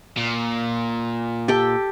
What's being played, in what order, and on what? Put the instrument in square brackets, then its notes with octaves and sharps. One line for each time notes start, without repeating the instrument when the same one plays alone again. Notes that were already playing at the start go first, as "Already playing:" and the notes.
[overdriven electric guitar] A#2
[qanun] G4 A4 G5